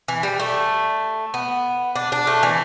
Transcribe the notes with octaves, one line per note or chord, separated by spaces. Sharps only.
E3
G3
A3
B3
D4
D4
A3
E3